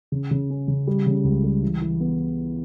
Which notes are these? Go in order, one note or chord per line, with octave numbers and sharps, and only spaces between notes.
C#3
C#3
C#4
C#3
G3
C#3
C#2
G3
E3
E3
B3